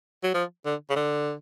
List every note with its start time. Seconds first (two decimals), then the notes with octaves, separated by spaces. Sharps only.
0.23 F#3
0.34 F3
0.66 D3
0.90 C#3
0.96 D3